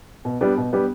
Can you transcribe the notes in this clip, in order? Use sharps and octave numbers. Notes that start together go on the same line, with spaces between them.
B2
G3 B3 D4 G4
B2
G3 B3 D4 G4